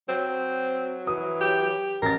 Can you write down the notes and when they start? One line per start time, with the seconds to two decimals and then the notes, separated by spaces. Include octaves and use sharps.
0.09 F#3 C4
1.07 E3 D#6
1.41 G4
2.02 A1 A#4 A6